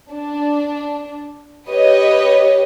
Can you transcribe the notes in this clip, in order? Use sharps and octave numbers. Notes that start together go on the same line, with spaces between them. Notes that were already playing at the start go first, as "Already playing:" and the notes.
D4
G4 B4 C#5 D#5